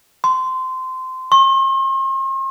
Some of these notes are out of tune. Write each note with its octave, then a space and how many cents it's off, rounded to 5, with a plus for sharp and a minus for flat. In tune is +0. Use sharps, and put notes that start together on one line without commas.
C6 -20
C6 +45